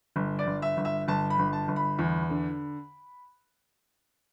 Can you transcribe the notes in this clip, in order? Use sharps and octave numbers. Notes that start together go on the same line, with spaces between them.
G1
D5
G1
E5
G1
E5
G1 A5
B5
G1
A5
G1
B5
E2
D3